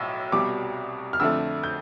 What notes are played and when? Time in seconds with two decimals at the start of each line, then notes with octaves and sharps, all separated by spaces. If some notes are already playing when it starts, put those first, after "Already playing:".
Already playing: B1 A2 E6
0.32 C2 B2 G3 D6
1.13 F6
1.19 F2 D3 A3 E6
1.64 G6